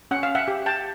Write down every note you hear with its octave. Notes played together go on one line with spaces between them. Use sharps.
C#4 F#5
F5
E5 F#5
G4
G5 A5